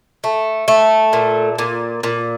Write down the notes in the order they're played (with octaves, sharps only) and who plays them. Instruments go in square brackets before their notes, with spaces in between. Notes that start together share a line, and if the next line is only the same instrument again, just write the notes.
[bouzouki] A3
A3
A#2
A#2
A#2